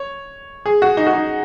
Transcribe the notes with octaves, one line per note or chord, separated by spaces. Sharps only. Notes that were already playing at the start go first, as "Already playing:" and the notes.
Already playing: C#5
G#4
F#4
D#4
F#4
D#4